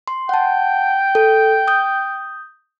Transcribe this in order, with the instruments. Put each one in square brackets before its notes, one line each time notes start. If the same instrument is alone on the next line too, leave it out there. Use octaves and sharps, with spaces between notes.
[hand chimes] C6
[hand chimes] F#5 A5 [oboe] G5
[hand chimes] A4
D#6 G6